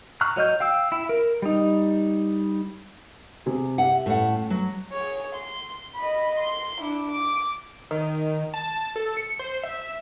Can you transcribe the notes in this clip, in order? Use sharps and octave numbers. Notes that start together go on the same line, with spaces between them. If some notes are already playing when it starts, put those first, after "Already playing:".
A#5 C#6 F6 F#6
F#3 C#5 D#5 F6 G6
F5 G5 E6
E4
A#4
G3 D#4
C3 G#4
G4 E5 F#5
A2 A3 C#4 F#5
F#3
G#4 C#5
C6
D#5 B5
C6
D4 E4
D6
D#3
A5
A4
C#7
C5
E5